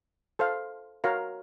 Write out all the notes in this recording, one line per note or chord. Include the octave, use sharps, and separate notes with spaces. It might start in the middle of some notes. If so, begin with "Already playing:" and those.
A4 C5 F5
F#4 A#4 C#5 F5 A#5